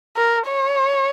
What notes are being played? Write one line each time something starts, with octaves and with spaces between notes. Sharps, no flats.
A#4
C#5